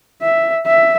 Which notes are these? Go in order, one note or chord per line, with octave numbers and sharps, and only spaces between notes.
E5
E5